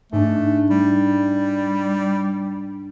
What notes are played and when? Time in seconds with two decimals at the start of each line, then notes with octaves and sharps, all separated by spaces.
0.12 G#2 A3 D4
0.70 G3